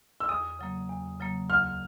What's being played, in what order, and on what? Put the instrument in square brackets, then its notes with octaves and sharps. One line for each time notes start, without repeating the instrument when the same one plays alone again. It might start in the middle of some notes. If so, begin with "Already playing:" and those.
[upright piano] E6
[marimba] E2 [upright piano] D#6
[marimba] C#3 F#3 A#3
E2
C#3 F#3 A#3
[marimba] D2 [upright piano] F6